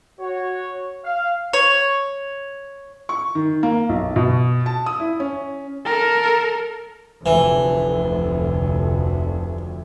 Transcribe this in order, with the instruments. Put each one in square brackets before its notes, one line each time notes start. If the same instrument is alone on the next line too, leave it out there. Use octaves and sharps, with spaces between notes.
[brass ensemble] F#4 C#5
F5
[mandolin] C#5
[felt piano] C#6
D#3
A#3
B1
B2
A5
D#6
E4
C#4
[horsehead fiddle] A4 A#4
[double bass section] F1 D2 [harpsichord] E3